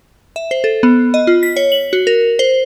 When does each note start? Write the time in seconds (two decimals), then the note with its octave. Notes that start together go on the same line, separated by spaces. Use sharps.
0.36 E5
0.51 C5
0.64 A4
0.83 B3
1.14 D#5
1.27 F4
1.43 B6
1.56 C#5
1.72 F#7
1.93 F#4
2.07 A#4
2.39 C5